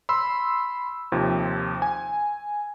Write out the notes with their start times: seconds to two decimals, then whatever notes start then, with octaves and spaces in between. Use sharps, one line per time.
0.09 B5 C6 E6
1.12 D#2 C3 F3
1.82 G#5